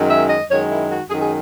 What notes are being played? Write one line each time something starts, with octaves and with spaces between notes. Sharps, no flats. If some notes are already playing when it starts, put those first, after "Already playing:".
Already playing: F#2 D#3 G#3
E5
D#5
F#2 D#3 G#3 C#5
E4
F#4
F#2 D#3 G#3 G#4
G#4